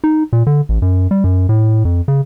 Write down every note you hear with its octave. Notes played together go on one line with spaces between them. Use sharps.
D#4
A#2
D3
A1
F#2
G3
F#2
A2
F2
C#3